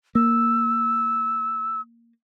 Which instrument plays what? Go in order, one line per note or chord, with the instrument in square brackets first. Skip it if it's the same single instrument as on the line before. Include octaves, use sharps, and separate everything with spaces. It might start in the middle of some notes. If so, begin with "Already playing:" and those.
[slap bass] A#3 [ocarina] E6